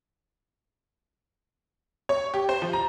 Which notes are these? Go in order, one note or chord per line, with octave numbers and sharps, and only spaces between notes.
C#5
G4
C5
F3
A#5